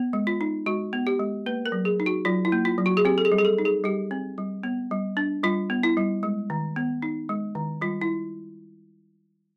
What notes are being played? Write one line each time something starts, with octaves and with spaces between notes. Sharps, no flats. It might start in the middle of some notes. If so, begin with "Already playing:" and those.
Already playing: B3
G#3
F4
D#4
G#3 F#4
B3
G4
G#3
A#3 B4
A#4
F#3
G#4
D#4
F#4
F#3 F4
E4
A#3
F4
F#3
F#4
G#4
C4 G4
A4
G#4
G3
G#4
A4
D#4
G#4
G3 G4
C4
G3
B3
G3
D4
G3 F4
B3
E4
G3
G#3
D#3
B3
D#4
G#3
D#3
G3 F4
E4